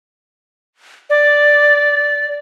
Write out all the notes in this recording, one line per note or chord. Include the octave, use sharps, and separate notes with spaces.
D5